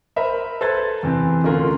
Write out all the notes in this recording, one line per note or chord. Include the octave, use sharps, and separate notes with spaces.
A#4 C5 D#5 E5 B5
A4 B4 C5 A#5 G#6 A6
E2 C3 E3 C4
D2 D3 C#4 F4 A#4